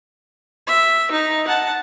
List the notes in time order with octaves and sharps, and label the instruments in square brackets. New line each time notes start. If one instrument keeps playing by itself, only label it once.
[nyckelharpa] E5
D#4
F#5 A5